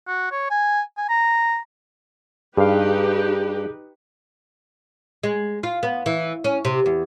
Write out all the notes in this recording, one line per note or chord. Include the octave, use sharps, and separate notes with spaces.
F#4
C#5
G#5
G#5
A#5
G2 D#4 G4 G#4 B4 F5
G#3
F4
B3
E3
C#4
C3
E2